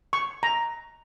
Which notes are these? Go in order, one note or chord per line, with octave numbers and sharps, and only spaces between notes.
C#6
A#5